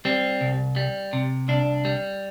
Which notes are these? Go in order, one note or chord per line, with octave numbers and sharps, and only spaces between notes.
G3 C4
C2
G3
C3
C2 D4
G3